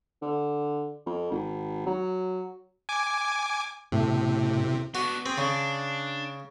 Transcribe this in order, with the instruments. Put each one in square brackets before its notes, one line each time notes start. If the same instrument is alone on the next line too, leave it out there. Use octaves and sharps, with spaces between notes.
[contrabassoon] D3
F2
G#1
F#3
[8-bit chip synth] G#5 D6
[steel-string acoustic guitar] A2 [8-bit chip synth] C3
[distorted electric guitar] B3 D4 [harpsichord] F#4
[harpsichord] C4 [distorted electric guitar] G#4
[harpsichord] C#3 [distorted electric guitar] D4